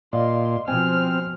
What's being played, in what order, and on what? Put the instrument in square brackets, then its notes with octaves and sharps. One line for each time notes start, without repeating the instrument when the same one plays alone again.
[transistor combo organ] A#2 [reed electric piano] D5 D#5 F5 [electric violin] C6
[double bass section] B2 F3 [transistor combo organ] C4 [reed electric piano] G5 G#5 [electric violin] F6